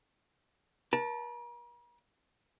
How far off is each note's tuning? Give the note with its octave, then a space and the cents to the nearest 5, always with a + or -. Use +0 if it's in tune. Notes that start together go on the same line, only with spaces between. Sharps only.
A#4 +45 A5 +0